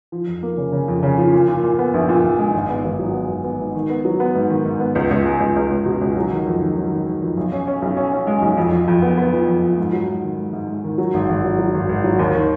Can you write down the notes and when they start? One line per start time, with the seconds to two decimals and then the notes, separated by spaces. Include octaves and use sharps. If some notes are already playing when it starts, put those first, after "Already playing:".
0.12 F3
0.27 F2
0.43 A#3
0.58 C#3
0.72 C#3
0.88 F2
1.03 C#3
1.18 F3
1.33 A#2
1.48 A#2
1.63 A#2
1.79 B3
1.94 A#1
2.09 A#2
2.24 A#1
2.39 G#3
2.54 G#1
2.70 B3
2.84 G#1
2.99 F#3
3.14 B3
3.29 G#1
3.44 B3
3.60 G#2
3.75 D#3
3.90 B3
4.05 F#3
4.20 B3
4.35 G#2
4.50 D#3
4.65 G#2
4.80 B3
4.95 C#2
5.11 C#2
5.26 G#3
5.40 C#2
5.56 C#2
5.71 C#2
5.85 B2
6.01 C#2
6.16 F#3
6.31 D#3
6.46 F2
6.61 D#3
6.77 F#3
6.91 D#3
7.06 D#3
7.22 F2
7.37 B1
7.52 C#4
7.67 C#4
7.82 B1
7.97 C#4
8.12 C#4
8.27 G#3
8.42 B1
8.57 F2
8.72 F2
8.88 F2
9.02 B3
9.17 B3
9.33 F3
9.48 F2
9.63 F3
9.78 G#2
9.93 F#3
10.08 G#2
10.23 D#3
10.39 G#2
10.53 G#2
10.69 G#2
10.84 D#3
10.98 F#3
11.14 G#1
11.29 G#1
11.44 F#3
11.59 F#3
11.74 G#1
11.89 G#1
12.04 F#3
12.19 D#2
12.34 D#3